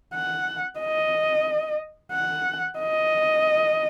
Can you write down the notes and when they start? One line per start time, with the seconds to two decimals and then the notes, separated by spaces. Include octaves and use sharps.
0.14 F#5
0.80 D#5
2.12 F#5
2.79 D#5